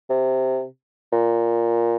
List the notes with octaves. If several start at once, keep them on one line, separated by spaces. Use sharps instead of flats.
C3
A#2